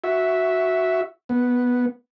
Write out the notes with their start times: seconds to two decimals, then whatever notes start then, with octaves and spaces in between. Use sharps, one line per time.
0.04 F#4 E5
1.29 B3